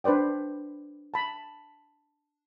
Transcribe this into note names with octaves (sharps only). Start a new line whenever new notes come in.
D4 B4 C5 D5 G5
A5 B5